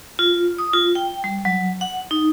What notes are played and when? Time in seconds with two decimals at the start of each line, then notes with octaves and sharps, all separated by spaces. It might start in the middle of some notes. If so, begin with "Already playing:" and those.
0.19 F4
0.58 D#6
0.73 F4
0.95 G5
1.24 G3
1.45 F#3
1.81 F#5
2.11 D#4